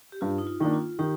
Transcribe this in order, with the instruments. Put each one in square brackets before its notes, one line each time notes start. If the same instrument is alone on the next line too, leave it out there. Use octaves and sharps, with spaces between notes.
[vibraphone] G4
[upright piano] G2 [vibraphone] F4
[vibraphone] D#4
F4
[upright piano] D#3 A#3 D4 [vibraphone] D#4
[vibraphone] F4
[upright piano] D#3 [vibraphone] D#4 G4